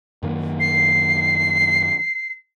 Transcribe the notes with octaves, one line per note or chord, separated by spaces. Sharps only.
F#2 D#3 A#3
C7